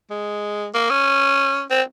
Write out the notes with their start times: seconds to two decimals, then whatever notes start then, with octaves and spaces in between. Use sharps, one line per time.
0.10 G#3
0.74 A#3
0.90 C#4
1.70 C4